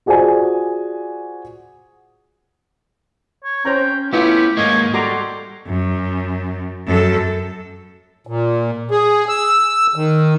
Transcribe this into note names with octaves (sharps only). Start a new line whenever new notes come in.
F4 F#4 G#4 C5 D5 G#5
C#5
C#4 C5 C#5 G5 A#5
A3 B3 C#4 E4 F4 G4 B4
G#2 G#3 A#3 C#5 D#5
G3 F#4 A4 A#5 C6 D6
F#2
F#2 A4
A#2
G#4
E6
D#3